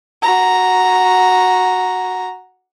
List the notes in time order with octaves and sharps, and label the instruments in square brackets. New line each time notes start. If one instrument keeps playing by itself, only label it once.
[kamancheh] F#4 A#5